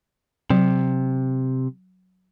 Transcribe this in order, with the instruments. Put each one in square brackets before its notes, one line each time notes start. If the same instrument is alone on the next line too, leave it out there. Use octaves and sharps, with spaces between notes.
[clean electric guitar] C3 [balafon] F#3